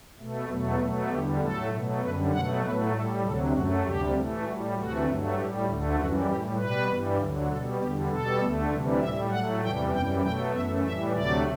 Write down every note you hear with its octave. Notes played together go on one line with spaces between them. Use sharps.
B2 A3
E2 B2 F#3 A3
B2 F#3 A3
E2 D3 G3 G4
A2 F#3 A3 A4
B2 F#3 A3
F#2 D3 G3 B4
B2 F#3 A3 F#5
A2 F#3 A3 B4
A2 G3 A4
D2 C3 F#3 A4
F#2 F#3 A3 F#4
D2 C3 G3 G4
A2 E3 A3
A2 G3 F#4
D2 C3 E3 A3 F#4
G2 F#3 A3
A2 G3 G4
D2 D3 A3
F#2 E3 G3 F#4
A2 G3 G4
B2 G3 B4
G2 E3 G3
D2 D3 F#3
B2 A4
G3
E2 D3 G3 G4
B2 G3 A4
D2 D3 A3
D2 C3 E3 G3
A2 G3 E5
A2 F#3 A3 F#5
E2 C3 E3 G3 G5
F#2 E3 G3 G5
B2 F#3 A3 G5
F#2 E3 A3 E5
A2 E3 G3 E5
D2 C3 F#3 A3 D5